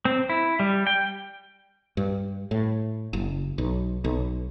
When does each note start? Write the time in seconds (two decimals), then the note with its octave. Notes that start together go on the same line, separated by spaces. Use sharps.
0.05 C4
0.29 E4
0.60 G3
0.87 G5
1.97 G2
2.51 A2
3.13 F#1
3.58 B1
4.04 B1